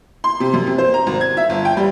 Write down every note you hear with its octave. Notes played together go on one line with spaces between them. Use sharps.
C6
C3
F#2
C3
C5
A#5
G#1
G#6
E5
G1
G5
G3